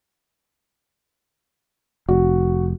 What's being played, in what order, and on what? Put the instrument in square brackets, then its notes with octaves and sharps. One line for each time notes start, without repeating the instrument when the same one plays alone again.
[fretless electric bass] F1 [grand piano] F#4